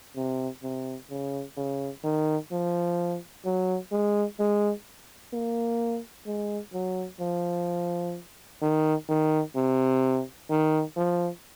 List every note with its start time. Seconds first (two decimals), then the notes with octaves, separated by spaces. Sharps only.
0.16 C3
0.63 C3
1.10 C#3
1.57 C#3
2.04 D#3
2.52 F3
3.45 F#3
3.92 G#3
4.39 G#3
5.33 A#3
6.26 G#3
6.73 F#3
7.20 F3
8.62 D#3
9.09 D#3
9.56 C3
10.50 D#3
10.97 F3